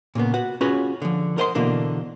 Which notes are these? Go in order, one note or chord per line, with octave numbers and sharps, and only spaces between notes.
A#2 C#3 A#3 B3
F#4 B4 F#5
C#4 F4 F#4 G#4 B4 C#5
D3 F3
A#4 C5 D#5 F#5 C6
B2 D3 E3 A#3 D4